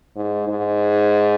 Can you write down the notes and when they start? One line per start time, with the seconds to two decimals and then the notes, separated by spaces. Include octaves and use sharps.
0.16 G#2
0.48 G#2